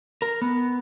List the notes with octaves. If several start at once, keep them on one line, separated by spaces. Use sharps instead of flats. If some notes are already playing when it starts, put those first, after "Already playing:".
A#4
B3